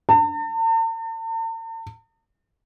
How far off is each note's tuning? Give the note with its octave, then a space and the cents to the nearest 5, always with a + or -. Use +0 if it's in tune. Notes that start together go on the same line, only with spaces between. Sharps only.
A5 +45